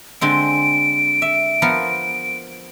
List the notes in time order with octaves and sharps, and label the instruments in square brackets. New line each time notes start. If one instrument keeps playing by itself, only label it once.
[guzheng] D3 G#3 C4 [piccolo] D7
[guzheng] E5
F3 B3 A#4